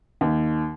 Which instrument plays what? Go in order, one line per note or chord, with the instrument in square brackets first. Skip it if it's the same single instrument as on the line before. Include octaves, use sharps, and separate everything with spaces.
[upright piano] D#2